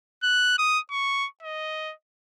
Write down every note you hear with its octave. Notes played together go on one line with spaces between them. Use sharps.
F#6
D#6
C#6
D#5